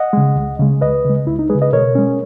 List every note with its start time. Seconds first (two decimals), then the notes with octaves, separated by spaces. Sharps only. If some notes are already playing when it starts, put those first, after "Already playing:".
Already playing: D#5 F#5
0.13 C#3 G#3
0.36 C#2
0.59 C#3 G#3
0.81 C#2 B4 D#5
1.05 C#3 G#3
1.27 C#2 E4
1.39 D#4
1.50 C#3 G#3 G#4 B4
1.62 B4 D#5
1.73 B2 A#4 C#5
1.95 G#3 C#4